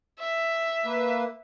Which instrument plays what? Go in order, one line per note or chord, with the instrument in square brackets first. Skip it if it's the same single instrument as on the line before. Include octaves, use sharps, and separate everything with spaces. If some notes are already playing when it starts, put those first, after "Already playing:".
[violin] E5
[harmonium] A#3 B4